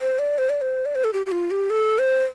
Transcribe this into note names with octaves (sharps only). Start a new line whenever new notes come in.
C5
D5
C5
D5
C5
D5
C5
A4
G4
G4
F4
G4
A4
C5